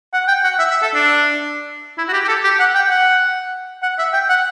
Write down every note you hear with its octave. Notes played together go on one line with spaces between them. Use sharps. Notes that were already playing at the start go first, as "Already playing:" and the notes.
F#5
G5
F#5
E5
E5
A4
D4
E4
F#4
G4
G4
A4
G4
F#5
G5
F#5
F#5
E5
G5
F#5